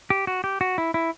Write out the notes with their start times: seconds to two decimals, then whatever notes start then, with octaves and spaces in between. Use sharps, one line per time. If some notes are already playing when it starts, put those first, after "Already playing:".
0.10 G4
0.27 F#4
0.44 G4
0.61 F#4
0.78 E4
0.94 E4